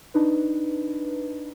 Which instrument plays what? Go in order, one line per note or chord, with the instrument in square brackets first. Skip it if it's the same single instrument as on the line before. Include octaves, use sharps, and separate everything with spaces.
[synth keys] D4 D#4 B4